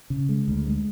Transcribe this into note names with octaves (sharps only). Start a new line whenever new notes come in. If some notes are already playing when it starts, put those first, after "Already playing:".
C#3
G#3
D2
G#3